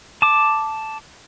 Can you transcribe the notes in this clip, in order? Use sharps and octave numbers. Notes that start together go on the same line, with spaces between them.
A5 D6